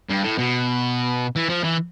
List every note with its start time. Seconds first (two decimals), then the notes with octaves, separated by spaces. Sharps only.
0.10 G2
0.24 A2
0.38 B2
1.36 E3
1.49 F3
1.64 E3